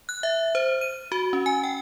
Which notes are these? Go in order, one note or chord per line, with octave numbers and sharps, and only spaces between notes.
F#6
E5
C5
D#7
F#4
C#4
G#5
G5